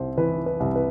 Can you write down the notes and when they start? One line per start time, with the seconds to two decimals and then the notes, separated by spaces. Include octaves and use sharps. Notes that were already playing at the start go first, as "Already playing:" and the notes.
Already playing: C2 C5
0.18 E3 B4
0.46 B4
0.60 C2
0.76 B4